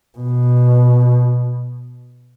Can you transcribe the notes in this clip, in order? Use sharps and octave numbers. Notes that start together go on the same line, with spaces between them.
B2